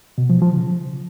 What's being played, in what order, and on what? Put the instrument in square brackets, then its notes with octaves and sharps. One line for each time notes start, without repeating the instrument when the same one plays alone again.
[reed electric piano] B2
F3
F3
C#3